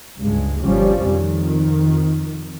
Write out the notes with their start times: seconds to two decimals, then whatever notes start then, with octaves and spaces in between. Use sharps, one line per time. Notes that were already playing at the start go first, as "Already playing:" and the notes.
0.19 C#2 G2 G#3
0.62 G1 F3 G3 C#4
1.05 F2 D#3